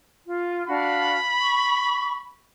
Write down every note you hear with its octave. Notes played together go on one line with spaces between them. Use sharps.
F4
D4 F#4 F5 B5
C#6